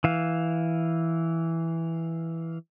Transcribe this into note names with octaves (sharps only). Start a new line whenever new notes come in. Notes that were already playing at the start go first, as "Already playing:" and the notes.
E3 F5